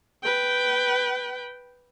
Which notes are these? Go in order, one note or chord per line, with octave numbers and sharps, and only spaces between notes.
B4 G5